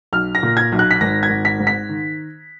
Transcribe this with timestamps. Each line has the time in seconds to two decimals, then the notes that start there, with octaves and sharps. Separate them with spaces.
0.13 B1 F6
0.35 A#6
0.43 A#2
0.57 G#6
0.72 B1
0.79 F#6
0.91 B6
1.01 G#1 A#6
1.23 G#6
1.30 G#1
1.45 B6
1.60 G#2
1.67 B6
1.89 D#3